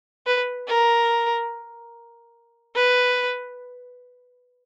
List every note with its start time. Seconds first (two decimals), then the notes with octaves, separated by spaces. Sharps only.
0.26 B4
0.68 A#4
2.75 B4